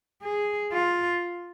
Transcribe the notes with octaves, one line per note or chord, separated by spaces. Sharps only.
G#4
F4